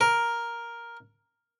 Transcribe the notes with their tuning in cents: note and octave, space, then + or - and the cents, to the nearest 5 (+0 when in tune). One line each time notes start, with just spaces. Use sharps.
A#4 +5